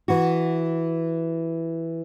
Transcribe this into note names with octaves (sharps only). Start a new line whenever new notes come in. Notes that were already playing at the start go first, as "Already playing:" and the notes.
E3 F#4